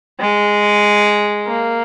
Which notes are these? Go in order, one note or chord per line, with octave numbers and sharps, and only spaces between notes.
G#3
A#3